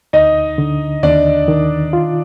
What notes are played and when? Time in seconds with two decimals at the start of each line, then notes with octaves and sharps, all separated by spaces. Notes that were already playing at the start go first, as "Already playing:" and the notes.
0.13 D2 D#4 D#5
0.58 D3
1.03 D#2 D4 D5
1.48 D#3
1.93 F4